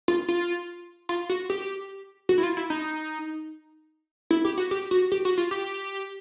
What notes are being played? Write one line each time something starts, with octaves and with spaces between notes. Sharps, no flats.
F4
F4
F4
F#4
G4
F#4
E4
F4
E4
D#4
E4
G4
F#4
G4
F#4
G4
F#4
F4
G4